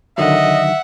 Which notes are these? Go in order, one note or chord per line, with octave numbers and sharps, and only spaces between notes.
D3 D#3 F#3 D#5 E5 F#5